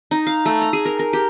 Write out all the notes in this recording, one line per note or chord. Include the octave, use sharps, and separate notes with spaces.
D#4
F5
A3
A#5
G#4
A#4
A#4
G4